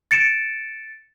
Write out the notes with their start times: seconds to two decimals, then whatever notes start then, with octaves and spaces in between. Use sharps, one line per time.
0.11 A6 C#7 D7 E7